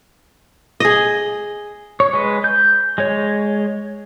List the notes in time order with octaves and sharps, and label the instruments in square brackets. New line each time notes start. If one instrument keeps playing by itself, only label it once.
[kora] G#4 D#5
[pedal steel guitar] C#5
G#3 B4
G6
G#3 C#5